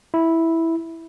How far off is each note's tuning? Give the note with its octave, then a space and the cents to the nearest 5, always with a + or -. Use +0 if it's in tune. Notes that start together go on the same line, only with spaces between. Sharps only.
E4 -5